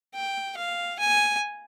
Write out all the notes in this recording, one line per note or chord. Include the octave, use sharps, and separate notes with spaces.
G5
F5
G#5